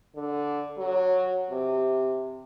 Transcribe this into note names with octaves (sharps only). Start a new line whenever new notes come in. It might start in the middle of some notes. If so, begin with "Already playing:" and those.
D3
F#3
C3